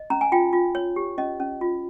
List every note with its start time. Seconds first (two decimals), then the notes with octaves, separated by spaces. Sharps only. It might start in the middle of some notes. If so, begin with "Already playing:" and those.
Already playing: D#5
0.10 C#4 A#5
0.21 G#5
0.32 F4 G5
0.53 F4
0.75 C#5
0.96 G4
1.18 C#4 D#5
1.40 C#4
1.61 F4